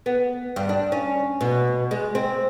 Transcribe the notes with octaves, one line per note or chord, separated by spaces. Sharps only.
B3
G2
D4
C#4
B2
G#3
C4